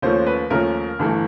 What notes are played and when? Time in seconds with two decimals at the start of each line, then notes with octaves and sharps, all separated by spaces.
0.02 D#2 C#3 F3 A3 C#4 C5
0.26 B4
0.50 D#2 C#3 F3 A3 C#4 A#4
0.99 G1 G2 E3 A3